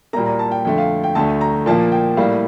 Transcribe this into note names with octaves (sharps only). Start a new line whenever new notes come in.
A#2 G3 A#3 A#5
A#5
A5
G5
F2 D3 A3 G5
F5
G5
D2 D3 A3 A5
A#5
A#2 F3 A#3 A5
G5
A2 G3 A#3 F5